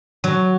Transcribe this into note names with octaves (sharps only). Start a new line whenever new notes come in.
F#3